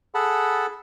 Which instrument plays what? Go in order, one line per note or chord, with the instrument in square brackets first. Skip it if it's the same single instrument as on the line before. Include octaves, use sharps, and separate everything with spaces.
[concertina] G#4 A4 F#5 A5 B5